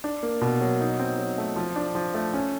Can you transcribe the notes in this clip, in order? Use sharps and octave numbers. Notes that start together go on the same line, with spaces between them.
D4
A#3
B2
F#3
D#4
C4
F#3
A3
F3
D4
F3
A3
C#4